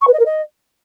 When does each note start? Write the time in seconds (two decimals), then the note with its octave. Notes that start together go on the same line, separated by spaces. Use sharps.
0.01 C#6
0.07 B4
0.13 D#5
0.19 A#4
0.25 D#5